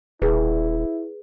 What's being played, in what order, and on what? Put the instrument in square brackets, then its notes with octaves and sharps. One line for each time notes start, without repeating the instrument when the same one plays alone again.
[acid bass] D#1 [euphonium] E4 [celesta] G#4 B4